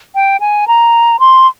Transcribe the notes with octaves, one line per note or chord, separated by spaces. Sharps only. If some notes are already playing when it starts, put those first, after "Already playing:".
G5
G#5
A#5
C6